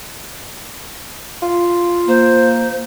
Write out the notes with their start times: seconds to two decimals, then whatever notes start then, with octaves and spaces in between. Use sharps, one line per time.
1.42 F4
2.08 A#3 C5